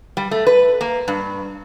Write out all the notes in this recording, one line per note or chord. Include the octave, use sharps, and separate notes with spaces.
G3
A3
B4
A#3
G2